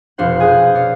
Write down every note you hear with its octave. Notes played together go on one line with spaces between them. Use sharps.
F1 B2 D4 C5 F5 F#5
G#4 G#5 D#6 F#6 G6
C#5 D5 F5